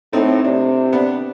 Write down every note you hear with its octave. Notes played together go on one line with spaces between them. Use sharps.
A2 A3 C4 D#4
C3 D4
B3 D4